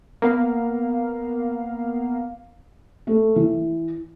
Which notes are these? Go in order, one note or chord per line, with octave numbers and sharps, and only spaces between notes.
A#3 B3 F5
A3
E3